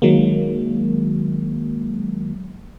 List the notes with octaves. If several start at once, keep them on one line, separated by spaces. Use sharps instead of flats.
D#3 F#3 G#3 A#3